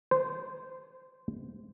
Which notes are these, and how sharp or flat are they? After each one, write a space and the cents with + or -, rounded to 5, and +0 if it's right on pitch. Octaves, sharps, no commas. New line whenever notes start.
C5 -15